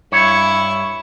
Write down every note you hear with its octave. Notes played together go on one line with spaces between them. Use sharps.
G2 E4 C#5 C#6